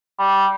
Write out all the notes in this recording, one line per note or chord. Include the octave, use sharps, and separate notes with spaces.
G3